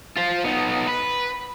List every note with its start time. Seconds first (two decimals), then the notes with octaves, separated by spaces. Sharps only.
0.17 F4 C5
0.44 B3 D#4
0.87 B4